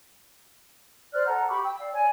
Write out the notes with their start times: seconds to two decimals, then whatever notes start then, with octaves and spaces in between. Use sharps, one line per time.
1.13 C5 D5 F6 F#6
1.25 A4 F#5 A#5
1.49 G4 B5 C#6 D6
1.63 G5 E6
1.79 D5 F5
1.92 C#5 D5 G#5